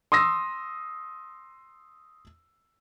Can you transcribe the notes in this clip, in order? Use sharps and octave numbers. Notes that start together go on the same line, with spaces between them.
C6 D#6 E6 A#6